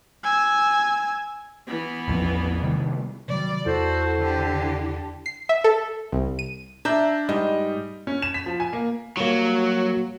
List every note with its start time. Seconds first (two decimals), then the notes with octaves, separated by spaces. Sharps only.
0.23 G#5 E6
1.67 E3 B3
2.08 A1 E2 F3
2.63 C3 D#3 G3
3.28 C3 D#3 F#3 G3 D5
3.66 E2 E4 F#4 A4 C5
4.18 D3 G4
5.26 C7
5.49 E5
5.64 A4
6.12 C2
6.39 D#7
6.85 D4 E5 A#5 G6
7.29 G#2 G3 D#5
8.07 C#4
8.22 E7
8.34 B6
8.46 F3
8.60 G#5
8.73 A#3
9.17 F#3 G3 A#3